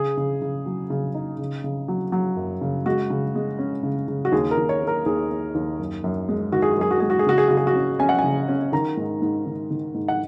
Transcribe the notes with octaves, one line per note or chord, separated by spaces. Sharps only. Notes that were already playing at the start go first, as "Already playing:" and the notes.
Already playing: C#3 G#4
C#3
C#3
F#3
C#3
D#4
C#3
C#3
F#3
F#3
F#2
C#3
G#3 F#4
C#3
G#3
C#4
C#3
C#3
F#4
D#2 G#4
A#4
D#2
C#5
A#3
A#4
D#2 G#4
A#3
D#2
F#2
F#2
G#3
D#3 F#4
G#4
F#4
F#2 G#4
F#4
G#3 G#4
F#4
G#4
C#3 F#4
G#4
C#3 F#4
G#4
F#4
C#4
C#4 G#5
F#5
G#5
C#3
C#4
D#3 A#5
G#2
G#2
D#3
D#3
G#2
F#5